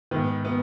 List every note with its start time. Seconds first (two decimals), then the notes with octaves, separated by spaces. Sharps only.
0.11 G#2 D#3 B3
0.45 B3